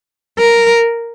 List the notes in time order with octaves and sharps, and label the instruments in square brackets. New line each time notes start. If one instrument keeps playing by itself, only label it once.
[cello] A#4